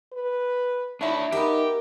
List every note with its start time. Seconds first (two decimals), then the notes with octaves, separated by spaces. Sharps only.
0.12 B4
1.01 D4 E4 C#5 E5
1.32 B3 D#4 G4 A#4 E5